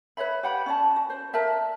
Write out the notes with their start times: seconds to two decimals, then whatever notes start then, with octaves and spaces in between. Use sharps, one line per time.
0.17 B4 C#5 E5 B5
0.43 G4 F#5 B5
0.66 C#4 D5 A5
0.96 F#4
1.10 C5
1.33 A#4 D5 E5 A5